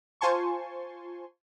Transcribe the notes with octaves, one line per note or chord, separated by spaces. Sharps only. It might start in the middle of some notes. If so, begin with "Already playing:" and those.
F4 C5 G#5 A5 C6 C#6